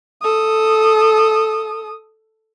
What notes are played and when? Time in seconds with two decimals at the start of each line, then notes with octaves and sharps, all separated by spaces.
0.22 A4 D#6